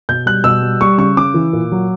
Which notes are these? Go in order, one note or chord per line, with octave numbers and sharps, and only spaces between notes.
B2 G6
G3 F#6
B2 E6
G3
G3 C#6
C#3 C#6
C#3 D6
E3
A#2
F#3